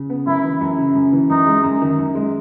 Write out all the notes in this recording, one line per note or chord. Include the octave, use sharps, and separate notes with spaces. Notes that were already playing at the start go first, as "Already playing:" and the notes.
Already playing: C#3
B3
F#2 E4
E3
F#2
C#3
F#2
E3
F#2 D#4
G#3
F#2
D#3
F#2
G#3